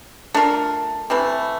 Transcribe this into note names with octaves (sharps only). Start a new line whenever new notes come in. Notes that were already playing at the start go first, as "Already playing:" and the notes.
A3 D4 F4 A#4
C3 E3 A3